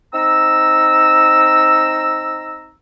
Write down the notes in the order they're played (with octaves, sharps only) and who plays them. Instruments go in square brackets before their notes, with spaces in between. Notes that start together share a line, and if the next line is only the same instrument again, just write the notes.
[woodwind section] C4 D#4 A#5 E6